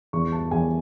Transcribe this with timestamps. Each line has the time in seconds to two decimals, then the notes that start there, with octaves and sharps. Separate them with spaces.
0.13 E2 C#6
0.32 A5
0.51 E2 G#5